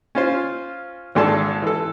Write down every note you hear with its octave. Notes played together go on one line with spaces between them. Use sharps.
C#4 F4 C5
G#1 G#2 D4 A4 A5
E3 A4